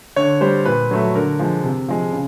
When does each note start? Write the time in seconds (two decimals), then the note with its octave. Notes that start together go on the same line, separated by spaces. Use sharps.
0.16 D3 C#5
0.41 G3 C5
0.65 A#2 B4
0.91 F#3 A3
1.15 D3 A#4
1.39 F3 G#3
1.64 C3
1.88 F3 G#3
2.12 C#3